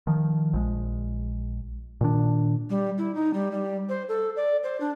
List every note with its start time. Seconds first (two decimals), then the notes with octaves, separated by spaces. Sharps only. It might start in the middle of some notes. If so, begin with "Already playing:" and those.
0.07 D#3 F3
0.53 A#1 G#3
2.01 A#2 D#3 D4
2.70 G3
2.98 E4
3.15 D#4
3.33 G3
3.51 G3
3.89 C5
4.08 A4
4.36 D5
4.63 C5
4.80 D4